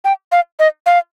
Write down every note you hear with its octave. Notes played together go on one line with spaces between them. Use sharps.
G5
F5
D#5
F5